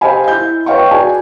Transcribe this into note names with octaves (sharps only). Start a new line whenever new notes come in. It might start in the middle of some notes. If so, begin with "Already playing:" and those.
G4 C5 D#5 F5 G#5 B5
E4 G6
B4 C#5 D#5 F5 G5 C#6
F#4 G#4 D5 G#5